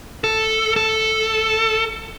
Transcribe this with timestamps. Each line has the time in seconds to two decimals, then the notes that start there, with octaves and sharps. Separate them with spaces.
0.24 A4
0.76 A4